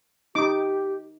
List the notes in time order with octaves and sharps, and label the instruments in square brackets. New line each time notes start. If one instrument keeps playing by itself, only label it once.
[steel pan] D#4 D6 [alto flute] G4